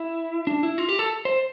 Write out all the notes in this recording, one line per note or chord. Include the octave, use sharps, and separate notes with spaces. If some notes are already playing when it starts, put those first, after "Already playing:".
Already playing: E4
D4
E4
F4
G4
A4
C5